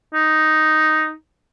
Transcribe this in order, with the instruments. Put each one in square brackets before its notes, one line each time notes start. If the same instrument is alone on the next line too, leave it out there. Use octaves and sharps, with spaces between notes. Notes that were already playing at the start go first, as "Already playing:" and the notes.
[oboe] D#4